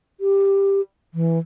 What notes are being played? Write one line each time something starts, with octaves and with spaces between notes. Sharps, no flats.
G4
E3